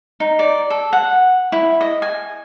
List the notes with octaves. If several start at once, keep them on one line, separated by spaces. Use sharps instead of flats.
D#4
D5
A4
F#5
E4
D#5
G#5